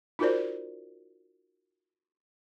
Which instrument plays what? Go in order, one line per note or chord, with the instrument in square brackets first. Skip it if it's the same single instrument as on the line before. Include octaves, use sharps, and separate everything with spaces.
[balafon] D#4 F4 F#4 A#4 C5 D5